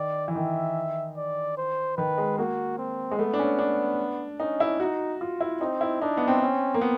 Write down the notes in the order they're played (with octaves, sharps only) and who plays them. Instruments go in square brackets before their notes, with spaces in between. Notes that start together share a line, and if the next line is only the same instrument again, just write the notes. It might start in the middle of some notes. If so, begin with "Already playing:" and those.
Already playing: [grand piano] D#3 [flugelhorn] D5
[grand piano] E3
[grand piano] D#3 [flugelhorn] E5
[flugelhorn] D5
C5
[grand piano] D#3 [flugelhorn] B4
[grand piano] G#3
[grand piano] A#3 [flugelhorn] F#4
[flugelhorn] C4
[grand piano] G#3
[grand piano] A3 [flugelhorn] B3
[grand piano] D4
C#4
D4
[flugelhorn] C#4 [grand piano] D#4
[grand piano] E4
[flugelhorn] D#4 [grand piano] F#4
[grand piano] F4
E4
[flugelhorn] C4 [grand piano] D#4
[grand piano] E4
[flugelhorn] D4 [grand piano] D#4
[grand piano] B3
C4
[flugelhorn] C#4
[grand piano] A#3
B3